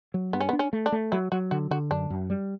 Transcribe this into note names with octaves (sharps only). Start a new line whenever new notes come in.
F#3
G2 B3
C#4
B3
D4
C#4
A3
D4
A3
F#3 E4
F#3 F#4
D3 F#4
D3 F#4
F#2 D4
F#2
G3